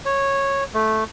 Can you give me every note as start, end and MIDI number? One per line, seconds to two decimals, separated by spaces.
0.05 0.64 73
0.74 1.04 57